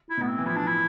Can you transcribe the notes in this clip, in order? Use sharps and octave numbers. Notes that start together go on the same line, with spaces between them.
E4
B2
A2 B3
C4
E3
F3 E4
D4
E4